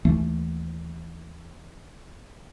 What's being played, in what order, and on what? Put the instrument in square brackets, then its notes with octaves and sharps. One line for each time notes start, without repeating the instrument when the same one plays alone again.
[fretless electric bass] D#2 E3 A3